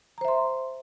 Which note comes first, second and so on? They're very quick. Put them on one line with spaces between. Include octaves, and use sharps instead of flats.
A#5 C5 E5 C6